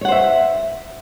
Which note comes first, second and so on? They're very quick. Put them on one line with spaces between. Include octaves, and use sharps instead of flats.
C#5 F#5 C5 E5